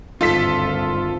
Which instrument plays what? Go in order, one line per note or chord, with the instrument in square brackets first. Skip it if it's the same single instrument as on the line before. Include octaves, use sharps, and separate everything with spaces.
[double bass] G#1 D2 [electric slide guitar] G2 D#4 [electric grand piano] F4 A4 B6